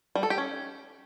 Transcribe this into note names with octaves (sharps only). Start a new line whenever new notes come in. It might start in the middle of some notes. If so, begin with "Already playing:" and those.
G3
A4
G4
C#4